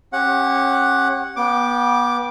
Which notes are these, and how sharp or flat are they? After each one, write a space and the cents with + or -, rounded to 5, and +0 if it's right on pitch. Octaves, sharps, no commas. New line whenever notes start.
C#4 -30 G4 +0 F#5 +0
B3 -30 G5 +0 D6 +0